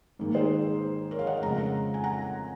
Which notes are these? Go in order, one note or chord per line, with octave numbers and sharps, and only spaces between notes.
G#2 D#3 A#3
G#4 C5
A#4 C#5
F5
D#5 F#5
F2 C#3 G#3 F#5 A#5
G#5
F#5 A#5